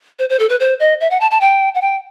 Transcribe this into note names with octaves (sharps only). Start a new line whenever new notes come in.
C5
C5
A4
B4
C5
D#5
E5
F#5
A5
A5
G5
F#5
G5